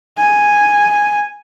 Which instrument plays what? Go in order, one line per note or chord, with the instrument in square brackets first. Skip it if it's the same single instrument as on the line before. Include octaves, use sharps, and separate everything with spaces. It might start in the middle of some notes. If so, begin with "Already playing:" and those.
[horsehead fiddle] G#5